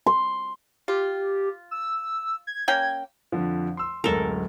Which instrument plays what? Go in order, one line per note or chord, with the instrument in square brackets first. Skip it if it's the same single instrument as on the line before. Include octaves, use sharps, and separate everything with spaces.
[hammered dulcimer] C6
[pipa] F4 [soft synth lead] G4
[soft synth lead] E6
G#6
[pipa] A#3 C#4 G5
[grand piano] F2 D3 F3
C6 E6
[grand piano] D1 F#2 G#3 [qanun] A4 A#4